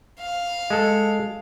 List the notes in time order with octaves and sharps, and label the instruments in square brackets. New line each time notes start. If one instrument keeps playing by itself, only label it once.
[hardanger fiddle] F5
[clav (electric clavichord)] G#3 A4